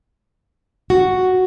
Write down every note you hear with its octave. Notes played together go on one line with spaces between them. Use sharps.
F#4